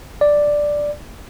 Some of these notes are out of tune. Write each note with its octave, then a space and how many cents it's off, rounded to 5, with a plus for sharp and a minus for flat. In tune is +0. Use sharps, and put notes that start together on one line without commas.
D5 +0